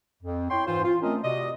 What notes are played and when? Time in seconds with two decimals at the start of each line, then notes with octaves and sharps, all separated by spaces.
0.22 F2
0.50 E4 C#5 G5 C6
0.67 G#2 E3 F4 C5
0.84 F4
1.02 A3 C4 C#4 A#4 D#5
1.23 C3 F#4 D5 D#5